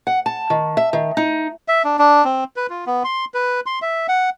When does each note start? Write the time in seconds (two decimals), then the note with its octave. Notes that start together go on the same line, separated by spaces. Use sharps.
0.07 F#5
0.26 A5
0.50 D#3
0.77 E5
0.93 D#3
1.17 D#4
1.68 E5
1.85 D4
1.99 D4
2.24 C4
2.56 B4
2.70 F4
2.86 B3
3.04 C6
3.34 B4
3.66 C6
3.82 E5
4.09 F#5